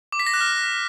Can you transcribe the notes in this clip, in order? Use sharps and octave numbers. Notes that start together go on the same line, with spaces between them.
D6
B6
A#6
F#6
F6